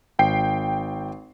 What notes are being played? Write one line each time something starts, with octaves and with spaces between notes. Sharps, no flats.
G#1 G5 C7